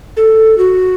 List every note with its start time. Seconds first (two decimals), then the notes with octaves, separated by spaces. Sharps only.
0.17 A4
0.58 F#4